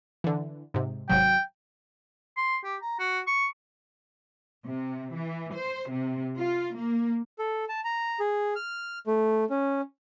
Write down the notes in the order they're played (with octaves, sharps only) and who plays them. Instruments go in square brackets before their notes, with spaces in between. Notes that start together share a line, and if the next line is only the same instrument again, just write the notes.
[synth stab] D3 E3
G#2 C3
[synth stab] G#1 C3 F#3 [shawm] G5
[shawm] C6
G4
A#5
F#4
C#6
[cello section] C3
E3
C5
C3
F4
A#3
[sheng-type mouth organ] A4
A5
A#5
G#4
F6
A3
C#4